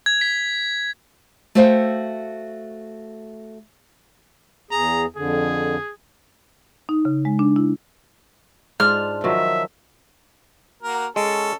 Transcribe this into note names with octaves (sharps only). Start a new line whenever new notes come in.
G#6
B6
A3 F#4 C5 E5 F5 G5
E2 G#4 A#5
F2 D3 G#4
D#4
C#3
G#3
D4
E4
G#2 D4 F4 F6
D#3 F3 F#3 E5
A#3 F#4 A#4
G#3 C#4 A4